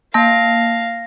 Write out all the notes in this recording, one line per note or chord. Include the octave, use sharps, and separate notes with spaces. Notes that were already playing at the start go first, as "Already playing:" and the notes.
A#3 F5 A5 A#6